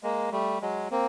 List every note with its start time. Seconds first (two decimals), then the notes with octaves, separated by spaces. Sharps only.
0.03 G#3 A#3
0.32 G3 A3
0.61 F#3 G#3
0.91 A#3 C4